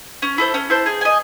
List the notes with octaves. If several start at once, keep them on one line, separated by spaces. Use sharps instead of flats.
C#4
E4 A4 C5
C#4
E4 A4 C5
G#4
D#5 G#5